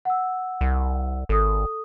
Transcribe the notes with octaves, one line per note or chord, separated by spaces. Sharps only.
F#5 E6
C2
G#1 A4 D#6